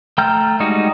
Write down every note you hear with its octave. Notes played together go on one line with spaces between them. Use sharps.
A3 G5 A#5 F6 G6
G3 G#3 D#4 F#4